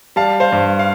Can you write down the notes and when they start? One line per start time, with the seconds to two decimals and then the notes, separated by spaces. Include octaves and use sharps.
0.16 G3 F5 A5
0.40 C5 F5
0.52 G2
0.79 F5